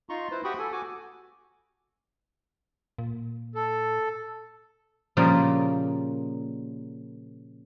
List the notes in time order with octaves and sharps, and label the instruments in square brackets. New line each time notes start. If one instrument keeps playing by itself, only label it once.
[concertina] D#4 F4 A#5 C6 C#6
E4 B4 C5
F#4 G4 G5 B5 C#6 D#6
A4 G#5
F#4 G#5 D6
[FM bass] A#2
[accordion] A4
[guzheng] A#2 C#3 F3 G3 A#3 G5